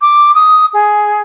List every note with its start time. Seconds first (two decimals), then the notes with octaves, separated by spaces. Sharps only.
0.01 D6
0.35 D#6
0.73 G#4